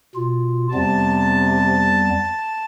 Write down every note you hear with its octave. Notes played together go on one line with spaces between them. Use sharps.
B2 F4
F2 C3 G3 B3 A5